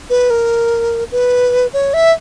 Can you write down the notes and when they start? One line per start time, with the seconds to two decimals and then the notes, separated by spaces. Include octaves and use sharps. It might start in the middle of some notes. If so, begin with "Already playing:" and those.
0.10 B4
0.30 A#4
1.12 B4
1.73 C#5
1.94 E5